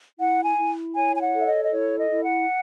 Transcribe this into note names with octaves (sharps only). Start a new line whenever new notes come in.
E4 F#5
G#5
E4
C#5 G#5
G#5
F#5
A4
E5
D#5
D#5
E4 C#5
D#5
E4
F#5